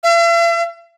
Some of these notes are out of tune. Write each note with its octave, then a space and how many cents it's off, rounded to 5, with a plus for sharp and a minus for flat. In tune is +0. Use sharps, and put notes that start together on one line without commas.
E5 +45